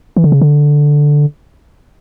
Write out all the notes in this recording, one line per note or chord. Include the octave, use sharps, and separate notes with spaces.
E3
D3
C#3
D3